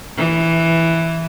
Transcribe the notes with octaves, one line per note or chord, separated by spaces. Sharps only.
E3